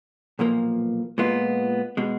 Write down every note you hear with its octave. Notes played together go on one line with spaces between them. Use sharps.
B1 A#2 F3 A#3
A#2 G#3 B3 F4
B2 G#3